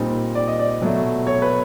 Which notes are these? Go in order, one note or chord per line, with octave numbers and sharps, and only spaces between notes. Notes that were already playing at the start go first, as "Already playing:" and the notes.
Already playing: A#2 G3 C4 D#4
D5
D#5
D5
B2 F#3 A3
C#5
B4